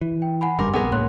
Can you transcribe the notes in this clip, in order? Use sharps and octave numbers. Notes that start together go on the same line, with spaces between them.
E3
G5
F#5 G#5 B5
F#1 G2 G3 A#4 C6 D6
A#1 B3 G#4 A#4
C#2 A2 A#3 C#5 C6 F#6